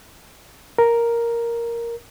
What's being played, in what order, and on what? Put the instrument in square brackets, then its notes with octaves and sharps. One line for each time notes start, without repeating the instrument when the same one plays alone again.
[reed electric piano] A#4